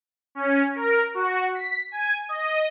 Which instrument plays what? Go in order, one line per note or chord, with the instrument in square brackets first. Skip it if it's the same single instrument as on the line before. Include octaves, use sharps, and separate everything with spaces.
[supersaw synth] C#4
A#4
F#4
B6
G#5
D#5